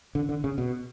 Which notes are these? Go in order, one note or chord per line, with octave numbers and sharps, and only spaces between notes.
D3
D3
C#3
B2